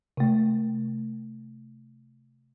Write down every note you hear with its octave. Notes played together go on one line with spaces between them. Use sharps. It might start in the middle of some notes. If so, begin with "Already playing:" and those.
C3 A3